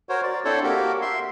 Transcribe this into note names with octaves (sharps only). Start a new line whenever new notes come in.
F#4 A#4 C5 C#5
D5
C4 D4 E4 A4 C5 C#5
A#3 F#4 G4 A#4
E5 C6